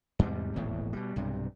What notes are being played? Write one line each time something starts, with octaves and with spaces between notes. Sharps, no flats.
E2 G#2 C3 G3
D#1 G#1 E2 A2
B2 G3
B1 G2 C3